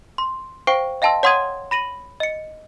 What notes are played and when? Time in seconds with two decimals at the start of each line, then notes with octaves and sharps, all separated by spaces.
0.18 C6
0.67 C5 F5 G5 C#6 C7 D7
1.02 D#5 F5 G5 A5 C6 E6
1.23 C#5 F#5 C6 D#6 G#6 D#7
1.71 B5 A#6 D#7 F#7
2.20 D#5 C#7